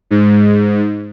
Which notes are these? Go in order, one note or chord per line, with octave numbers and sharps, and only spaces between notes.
G#2